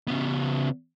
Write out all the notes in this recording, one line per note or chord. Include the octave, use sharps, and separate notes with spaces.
C#3 B3